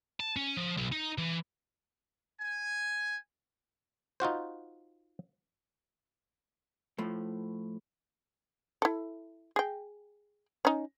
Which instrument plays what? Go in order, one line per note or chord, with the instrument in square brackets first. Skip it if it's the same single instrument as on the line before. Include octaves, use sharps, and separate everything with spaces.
[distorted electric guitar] A5
C#4
F3
B1
D#4
E3
[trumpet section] G#5
[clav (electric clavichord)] D#4 F4 F#4 C5
[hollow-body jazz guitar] A2 F3 A3
[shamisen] E4 A4
G#4 G5
C#4 D#4